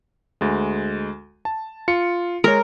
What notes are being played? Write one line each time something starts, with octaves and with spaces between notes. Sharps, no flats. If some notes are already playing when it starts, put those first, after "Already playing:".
D2 G#3
A5
F4 C#7
G#3 A#4 C#5